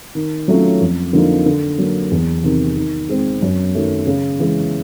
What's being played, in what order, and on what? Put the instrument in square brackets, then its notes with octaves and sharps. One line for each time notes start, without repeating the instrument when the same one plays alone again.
[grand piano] D#3
F#3 A3 C#4 F4
F2
D3 F3 A#3 D#4
D3
F#3 A#3
E2
C3 D#3
D#3
G#3 C4
F#2
D#3 F#3 A3
C#3
E3 G#3